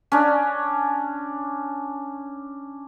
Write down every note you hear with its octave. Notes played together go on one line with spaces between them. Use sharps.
C#4 D4